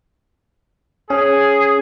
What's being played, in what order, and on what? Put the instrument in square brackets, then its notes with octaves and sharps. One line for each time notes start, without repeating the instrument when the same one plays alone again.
[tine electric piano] C#4 [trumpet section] G#4